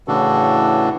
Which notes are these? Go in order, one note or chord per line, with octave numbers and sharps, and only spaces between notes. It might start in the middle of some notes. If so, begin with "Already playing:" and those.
A2 C#3 E3 D4 F#4 A4